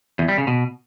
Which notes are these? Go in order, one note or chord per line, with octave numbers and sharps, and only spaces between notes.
E2
G3
C#3
B2